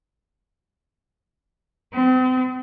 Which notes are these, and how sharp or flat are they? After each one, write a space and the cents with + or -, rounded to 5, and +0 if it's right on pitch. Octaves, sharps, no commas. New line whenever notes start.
C4 -40